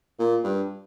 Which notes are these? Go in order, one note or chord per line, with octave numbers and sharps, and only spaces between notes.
A#2
G2